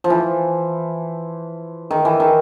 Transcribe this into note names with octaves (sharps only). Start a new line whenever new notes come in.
F3
E3
D#3
E3
D#3